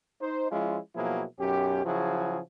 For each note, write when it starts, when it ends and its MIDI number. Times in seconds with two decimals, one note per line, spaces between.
0.21 0.49 63
0.21 0.49 72
0.50 0.78 53
0.50 0.78 56
0.50 0.78 61
0.50 0.78 64
0.50 0.78 65
0.95 1.23 47
0.95 1.23 53
0.95 1.23 54
0.95 1.23 58
0.95 1.23 64
0.95 1.23 68
1.39 1.84 35
1.39 1.84 42
1.39 1.84 61
1.39 1.84 67
1.85 2.40 49
1.85 2.40 53
1.85 2.40 54
1.85 2.40 64
1.85 2.40 66
1.85 2.40 68